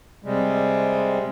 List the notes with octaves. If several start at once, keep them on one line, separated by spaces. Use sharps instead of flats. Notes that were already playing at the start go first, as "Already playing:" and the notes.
C3 G3 G#3